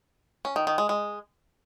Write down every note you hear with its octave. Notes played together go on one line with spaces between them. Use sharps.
C#4
D#3
D#3
G#3
G#3